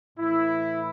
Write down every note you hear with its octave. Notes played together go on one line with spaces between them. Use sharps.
A2 E3 E4